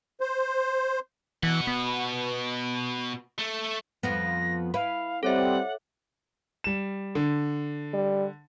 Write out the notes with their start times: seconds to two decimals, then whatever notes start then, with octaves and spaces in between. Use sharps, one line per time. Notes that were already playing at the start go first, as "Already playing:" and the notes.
0.20 C5
1.43 B2 E3 F#5
1.67 B3
3.38 A3
4.03 F2 F3 B3 A#6
4.74 E4 B4 F5
5.23 G3 C4 A4 C#5 E5 F#5
6.64 G3 E7
7.15 D3
7.93 G3